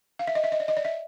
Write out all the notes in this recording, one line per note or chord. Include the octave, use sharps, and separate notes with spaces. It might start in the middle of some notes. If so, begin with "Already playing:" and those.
F5
E5
D#5
E5
D#5
D5
D#5
D5
E5